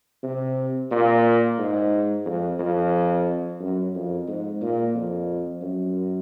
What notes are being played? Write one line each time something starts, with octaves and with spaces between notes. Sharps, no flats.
C3
A#2
G#2
F2
F2
F#2
F2
G#2
A#2
F2
F#2